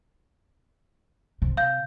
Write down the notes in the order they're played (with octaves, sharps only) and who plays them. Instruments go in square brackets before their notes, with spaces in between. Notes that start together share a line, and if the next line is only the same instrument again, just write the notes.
[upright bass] C3
[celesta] F5 G6